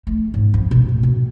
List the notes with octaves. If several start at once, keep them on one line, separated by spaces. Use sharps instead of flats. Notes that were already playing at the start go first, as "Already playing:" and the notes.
A3
G#2
F2
B2
A3
B2